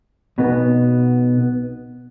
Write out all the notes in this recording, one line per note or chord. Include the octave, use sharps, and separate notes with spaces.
B1 B2 B3